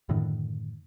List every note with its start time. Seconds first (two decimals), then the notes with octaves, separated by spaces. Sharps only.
0.09 F#2 A2 D3 D#3